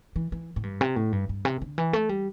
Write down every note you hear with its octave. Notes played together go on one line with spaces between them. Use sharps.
E3
E3
A2
G2
C3
A2
G2
G2
C3
D3
E3
A3
G3